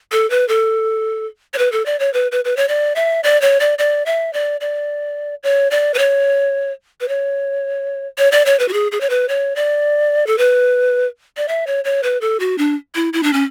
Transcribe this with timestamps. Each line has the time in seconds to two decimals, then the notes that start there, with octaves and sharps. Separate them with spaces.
0.12 A4
0.30 B4
0.49 A4
1.54 C#5
1.58 B4
1.72 A4
1.86 D5
2.00 C#5
2.14 B4
2.32 B4
2.45 B4
2.57 C#5
2.68 D5
2.96 E5
3.24 D5
3.42 C#5
3.60 D5
3.78 D5
4.06 E5
4.33 D5
4.61 D5
5.43 C#5
5.71 D5
5.94 B4
5.98 C#5
7.01 B4
7.08 C#5
8.18 C#5
8.32 D5
8.46 C#5
8.59 B4
8.68 F#4
8.73 G#4
8.92 G#4
9.01 C#5
9.10 B4
9.29 C#5
9.56 D5
10.27 A4
10.38 B4
11.37 D5
11.48 E5
11.67 C#5
11.85 C#5
12.03 B4
12.21 A4
12.40 F#4
12.58 D4
12.95 E4
13.13 E4
13.23 D4
13.33 C#4